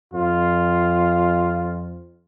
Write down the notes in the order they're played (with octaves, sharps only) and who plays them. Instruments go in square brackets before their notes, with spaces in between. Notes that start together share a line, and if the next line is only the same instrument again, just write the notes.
[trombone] F2 [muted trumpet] F4